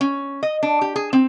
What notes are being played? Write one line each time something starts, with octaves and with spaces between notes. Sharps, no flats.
C#4
D#5
D4
G4
G#4
C4